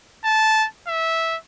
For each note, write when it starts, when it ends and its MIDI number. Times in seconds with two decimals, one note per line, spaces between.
0.24 0.66 81
0.87 1.36 76